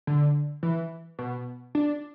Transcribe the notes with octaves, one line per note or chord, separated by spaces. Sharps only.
D3
E3
B2
D4